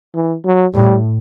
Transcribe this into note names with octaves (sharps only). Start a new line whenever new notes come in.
E3
F#3
A2 G3